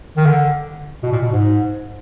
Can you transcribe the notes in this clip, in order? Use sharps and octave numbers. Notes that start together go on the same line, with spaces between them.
D#3
D3
B2
A#2
B2
G#2